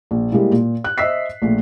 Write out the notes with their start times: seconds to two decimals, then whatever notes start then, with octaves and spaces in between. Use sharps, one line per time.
0.11 A#1
0.32 G3 G#3 A#3 E4
0.52 A#2
0.84 F#6
0.98 C5 D#5 E5 E6 B6 C7
1.42 A#1 A3